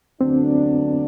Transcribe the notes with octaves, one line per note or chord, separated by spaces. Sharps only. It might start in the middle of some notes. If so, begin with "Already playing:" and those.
D2 D3 F#3 B3 C4 D4